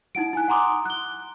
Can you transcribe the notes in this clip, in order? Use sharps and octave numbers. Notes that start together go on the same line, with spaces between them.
D#4 E4 F#5 D7
E4 G#5 F#6
F#5 G#5 A#5 C6 D6 D#6
F#6 G7